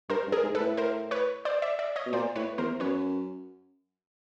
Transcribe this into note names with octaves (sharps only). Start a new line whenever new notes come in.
G2 A#4 C5
G2
G#4 A#4
G#2
A4 B4
A2
A#4 C5
B4 C#5
C5 D5
D5 E5
D5 E5
C#5 D#5
B2
A#2 C5 D5
A2 B4 C#5
E2 A#4 C5
F#2 B4 C#5